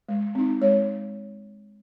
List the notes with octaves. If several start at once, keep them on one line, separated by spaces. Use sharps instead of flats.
G#3
C4 D#4
G#3 C#5